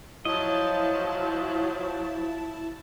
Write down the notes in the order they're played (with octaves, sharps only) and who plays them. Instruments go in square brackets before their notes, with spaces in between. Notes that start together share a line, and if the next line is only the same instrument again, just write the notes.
[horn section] F3 F#3 [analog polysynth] E4 A5 [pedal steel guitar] D#5